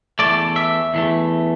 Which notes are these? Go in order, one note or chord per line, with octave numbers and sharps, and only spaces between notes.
E2 E3 A3 D5
E5
E2 E3 A3